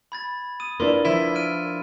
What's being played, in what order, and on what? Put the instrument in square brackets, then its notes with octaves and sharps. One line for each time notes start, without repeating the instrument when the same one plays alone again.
[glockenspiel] B5 G#6 A6
D#6 D#7
[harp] D4 E4 F4 [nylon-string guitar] A#4 B4 D5 [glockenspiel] C6
[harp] F3 [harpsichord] E4
[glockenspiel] F6 D7 D#7